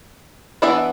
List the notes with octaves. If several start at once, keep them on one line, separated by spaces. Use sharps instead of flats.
E3 B3 D4 E4 E5